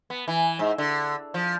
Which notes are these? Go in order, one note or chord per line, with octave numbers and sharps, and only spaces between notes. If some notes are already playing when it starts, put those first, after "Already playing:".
B3
E3
G#2
D3
F3